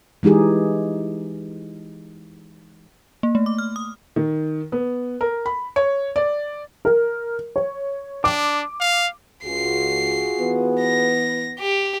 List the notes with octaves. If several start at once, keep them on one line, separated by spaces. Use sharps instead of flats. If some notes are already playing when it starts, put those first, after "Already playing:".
E3 G#3 D#4 G4 G#4
A#3
A3
D6
F6
D#6
D#3
B3
A#4
B5
C#5
D5
A#4
C#5
D4 D6
F5
C#2 F4 F#4 G#4 C7
E3 B3
A#6
G4